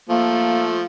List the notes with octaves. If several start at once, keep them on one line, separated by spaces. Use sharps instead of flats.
F3 A3 A#3